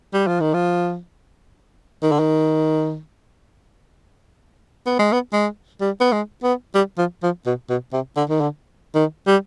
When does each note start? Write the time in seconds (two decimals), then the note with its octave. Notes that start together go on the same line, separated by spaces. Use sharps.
0.14 G3
0.27 F3
0.40 D#3
0.54 F3
2.02 D#3
2.11 D3
2.19 D#3
4.86 B3
4.99 G#3
5.12 B3
5.33 G#3
5.81 G3
6.00 B3
6.12 G#3
6.43 B3
6.74 G3
6.98 F3
7.23 F3
7.46 B2
7.69 B2
7.92 C3
8.16 D3
8.29 D#3
8.40 D3
8.95 D#3
9.27 G3